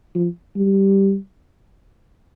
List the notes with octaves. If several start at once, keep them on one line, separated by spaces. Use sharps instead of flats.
F3
G3